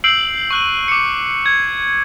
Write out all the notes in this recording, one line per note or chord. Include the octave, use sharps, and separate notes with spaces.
E6 G6 C7 D7 F#7
C#6 F#6 D#7
D6 C#7
G#6